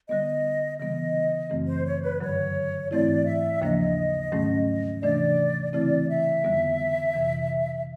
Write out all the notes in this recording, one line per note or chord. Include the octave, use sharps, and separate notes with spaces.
D3 G3 B3 D#5
C#3 E3 G3 B3 D#5
F#2 C#3 E3 A3 C4
C5
C#5
B4
G2 D3 F#3 C#5
G#2 E3 A3 C4 E4 D5
E5
D#2 C#3 F3 A#3 D4 D#5
G#2 D#3 F#3 A3 C#4
C3 E3 A3 D4 D5
C#3 E3 A3 C4 E4 D5
E5
F2 D3 G3 B3
F2 C3 E3